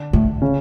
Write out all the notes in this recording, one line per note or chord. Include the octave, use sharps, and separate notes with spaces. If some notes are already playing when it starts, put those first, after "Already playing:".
Already playing: D3 D4
A2
C#3 C#4